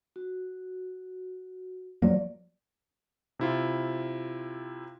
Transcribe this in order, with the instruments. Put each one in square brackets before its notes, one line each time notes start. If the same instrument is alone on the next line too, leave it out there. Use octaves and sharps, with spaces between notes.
[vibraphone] F#4
[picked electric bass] F3 F#3 A#3 [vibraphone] D5
[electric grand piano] C3 E4 F4